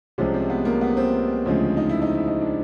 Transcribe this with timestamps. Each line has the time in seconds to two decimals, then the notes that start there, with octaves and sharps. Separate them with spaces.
0.18 C2 C3 F3 G#3 C#4
0.34 C4
0.50 B3
0.65 A#3
0.81 B3
0.97 C4
1.45 D2 C#3 F3 G#3
1.77 D#4
1.89 E4
2.02 D#4
2.15 E4
2.28 D#4
2.41 D4